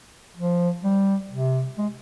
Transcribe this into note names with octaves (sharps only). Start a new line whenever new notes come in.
F3
G3
C3
G#3